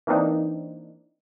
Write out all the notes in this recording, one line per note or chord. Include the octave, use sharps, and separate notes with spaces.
E3 A#3 C4 D4 D#4